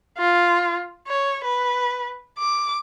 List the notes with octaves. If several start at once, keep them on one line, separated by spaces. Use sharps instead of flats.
F4
C#5
B4
D6